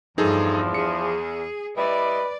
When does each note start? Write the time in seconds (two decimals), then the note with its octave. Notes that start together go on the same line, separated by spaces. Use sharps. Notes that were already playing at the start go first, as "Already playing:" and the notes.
0.18 E2 G2 F3 D#4 G#4 A4
0.74 G#4 C#7
1.77 G3 E4 B4 D5 D#5